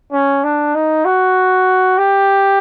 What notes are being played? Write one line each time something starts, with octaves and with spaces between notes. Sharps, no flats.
C#4
D4
D#4
F#4
G4